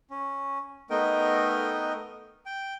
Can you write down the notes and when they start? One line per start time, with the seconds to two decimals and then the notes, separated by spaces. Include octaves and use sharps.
0.10 C#4
0.90 A3 B3 D#4 A#4 D#5 G5
2.46 G5